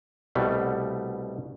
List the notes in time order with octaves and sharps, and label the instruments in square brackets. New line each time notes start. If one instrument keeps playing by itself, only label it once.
[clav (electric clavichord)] C2 B2 G3 A3